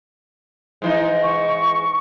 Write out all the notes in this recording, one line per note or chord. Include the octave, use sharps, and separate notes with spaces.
G#2 E3 D#4
C#6